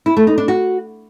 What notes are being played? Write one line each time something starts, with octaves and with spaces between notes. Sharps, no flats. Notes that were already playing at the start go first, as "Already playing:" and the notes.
E4
A3
D#4
D4
F#4